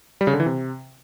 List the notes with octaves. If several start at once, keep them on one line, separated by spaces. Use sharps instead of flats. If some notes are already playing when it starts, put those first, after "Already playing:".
G3
C#3
D3
E3
C3